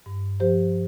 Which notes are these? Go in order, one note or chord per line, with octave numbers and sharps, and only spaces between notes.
G2
F3 G4 C5